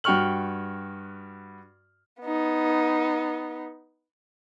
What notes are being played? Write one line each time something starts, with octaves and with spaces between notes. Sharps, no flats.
G2 F#4 G5 C#6 F6 F#7
B3 D#4